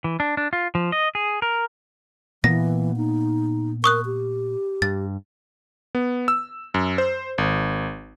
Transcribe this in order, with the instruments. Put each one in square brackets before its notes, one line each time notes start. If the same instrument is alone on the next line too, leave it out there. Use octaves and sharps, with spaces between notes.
[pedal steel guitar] E3
D4
D4
F4
F3
D#5
G#4
A#4
[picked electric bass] A#2 A#3 B3 [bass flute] E3 [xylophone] A#6
[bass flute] D#4
[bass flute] A#4 [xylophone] C#6 D#6 F#6
[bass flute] G4
[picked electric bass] G2 [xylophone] A6
[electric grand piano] B3
E6
F#2
C5
G#1